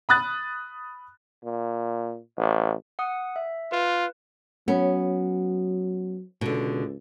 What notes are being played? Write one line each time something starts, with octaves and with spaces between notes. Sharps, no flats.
B5 D#6 F#6 A6
A#2
A1
F#5 D#6
E5
F4 B4
F#3 B3 C#4
C#2 B2 D3